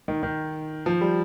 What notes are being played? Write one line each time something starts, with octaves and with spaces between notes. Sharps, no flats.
D#3
D#3
F3
G3